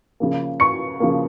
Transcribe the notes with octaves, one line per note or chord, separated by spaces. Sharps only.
C#3 F3 A#3
C#6 C#7
C#3 F3 A#3